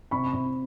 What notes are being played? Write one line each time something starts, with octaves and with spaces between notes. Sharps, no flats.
C3 B5 C#6
C3